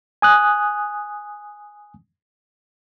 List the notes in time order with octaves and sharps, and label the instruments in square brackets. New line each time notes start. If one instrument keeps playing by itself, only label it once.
[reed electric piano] G#5 D#6 F#6